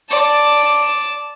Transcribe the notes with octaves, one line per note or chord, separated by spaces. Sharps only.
D5 A5